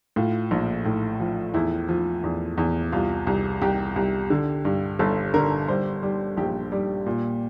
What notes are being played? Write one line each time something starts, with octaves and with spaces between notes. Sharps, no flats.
A2 F4
A#1
A2
F3
E2 E4
F3
E2
E2
C2 F4
C2
C2 G4
C2
D3
G2
G1 A4
D3 A#4
G3 C5
G3
A#1 G4
G3
A#2